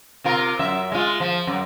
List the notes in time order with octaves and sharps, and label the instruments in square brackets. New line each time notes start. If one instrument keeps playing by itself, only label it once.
[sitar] C3 F4 A#4
F#2 E5
G#3 F4
F3
F#2